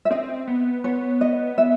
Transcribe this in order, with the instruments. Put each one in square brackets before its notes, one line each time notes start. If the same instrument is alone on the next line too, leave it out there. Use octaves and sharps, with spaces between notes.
[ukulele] E5
[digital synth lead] C4 [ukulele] D#5
[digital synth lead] B3
[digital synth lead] B3 [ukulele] C#5
[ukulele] D#5
E5